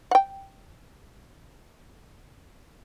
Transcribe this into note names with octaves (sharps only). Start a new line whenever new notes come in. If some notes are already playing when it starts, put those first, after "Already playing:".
F#5 G5